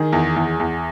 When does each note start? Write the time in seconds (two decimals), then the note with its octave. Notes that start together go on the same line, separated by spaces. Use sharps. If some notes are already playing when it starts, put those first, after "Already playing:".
Already playing: D#3 G#4
0.13 E2
0.36 E2
0.60 E2